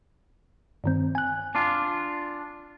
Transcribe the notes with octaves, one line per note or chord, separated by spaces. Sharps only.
G2 D#3 C4
G#5 F#6
D4 F4